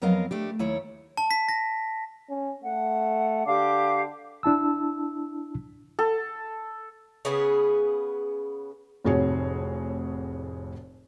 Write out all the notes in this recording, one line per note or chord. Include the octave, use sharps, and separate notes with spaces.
F2 F#3 B3 A#4 D#5 F5
A3 D4 G4
D#2 E4 C#5
A5
B6
A#6
C#4
A3 F#5
D3 G4 F5 D6
D4 E4 A5 E6
A4
C#3 B3 G#4
F1 F2 A2 F#4 G#4 C#5